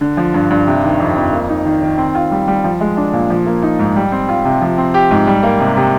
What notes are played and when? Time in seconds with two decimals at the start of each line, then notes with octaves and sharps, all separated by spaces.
0.01 D3
0.17 F3
0.34 G2
0.50 G2
0.67 C3
0.83 D#3
1.00 F2
1.16 F2
1.33 A#3
1.49 D#4
1.65 D#3
1.82 D#3
1.98 C4
2.15 F4
2.32 G3
2.48 G3
2.64 F3
2.81 G#3
2.97 D4
3.13 A#2
3.30 F3
3.46 A#3
3.62 D#4
3.79 G#2
3.96 G3
4.12 C4
4.29 F4
4.45 C3
4.61 F3
4.78 C4
4.94 G4
5.11 G#2
5.27 G3
5.43 A#3
5.60 C3
5.77 C3